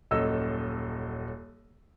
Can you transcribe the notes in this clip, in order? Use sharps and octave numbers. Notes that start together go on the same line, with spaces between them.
D#1 F#2 A4 D#5 E6